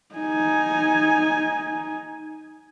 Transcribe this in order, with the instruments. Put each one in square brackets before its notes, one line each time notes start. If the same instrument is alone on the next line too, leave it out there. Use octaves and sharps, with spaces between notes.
[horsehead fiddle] D#4 G#5